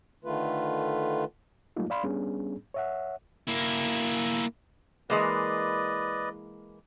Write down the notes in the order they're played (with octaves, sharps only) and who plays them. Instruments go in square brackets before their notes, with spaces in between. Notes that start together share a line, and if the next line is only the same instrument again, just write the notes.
[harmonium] D3 D#3 A3 F4 B4
[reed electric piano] F#3 G3 A3 A#3 D#4 F4
D5 F5 B5 C6
G3 B3 C#4 D4 G#4
C#5 E5 F#5
[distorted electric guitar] A#3 E4
[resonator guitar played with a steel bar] E3 G#3 A#3 [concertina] B4 D5 D#5